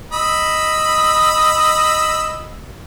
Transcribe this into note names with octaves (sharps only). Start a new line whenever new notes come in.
D#5 B5 E6